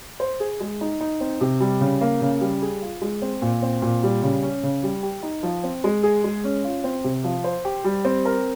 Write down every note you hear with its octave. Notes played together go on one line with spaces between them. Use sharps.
C5
G#4
G#3
D#4
D#4
C4
C3
G3
C#3
A#3
C#3
G3
G#4
F4
G#3
C4
A#2
C4
A#2
G3
C#3
C#4
C#3
G3
G4
D#4
F3
C4
G#3
G#4
G#3
C#4
F4
C4
C3
F3
C5
G4
G3
C4
A#4